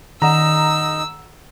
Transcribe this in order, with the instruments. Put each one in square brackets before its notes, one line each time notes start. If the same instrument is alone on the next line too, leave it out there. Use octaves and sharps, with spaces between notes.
[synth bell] D#3 F#5 E7 [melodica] D#4 [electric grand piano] A#5 [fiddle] E6